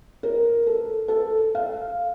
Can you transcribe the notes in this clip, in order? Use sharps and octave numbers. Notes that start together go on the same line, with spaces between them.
A#4
A4
A4
F5